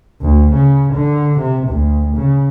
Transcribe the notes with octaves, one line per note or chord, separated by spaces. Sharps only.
D2
C#3
D3
C3
D2
C#3